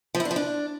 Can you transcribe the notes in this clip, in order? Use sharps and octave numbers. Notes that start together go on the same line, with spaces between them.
F3
E4
D4
F3
D4